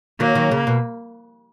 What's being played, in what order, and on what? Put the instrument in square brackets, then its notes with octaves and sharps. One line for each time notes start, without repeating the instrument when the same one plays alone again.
[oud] D#3 F#3 [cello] A#3
[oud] D#3 F#3
C#3
B2